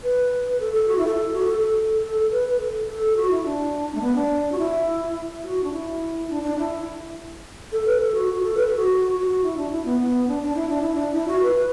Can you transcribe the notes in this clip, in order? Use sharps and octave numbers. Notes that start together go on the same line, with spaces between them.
B4
A4
A4
F#4
E4
A4
F#4
A4
A4
A4
A4
B4
B4
A4
A4
F#4
E4
D4
A3
B3
D4
F#4
E4
F#4
D4
E4
D4
D4
E4
A4
B4
A4
F#4
F#4
A4
B4
A4
F#4
F#4
F#4
E4
D4
E4
B3
B3
D4
D4
E4
D4
E4
D4
E4
F#4
B4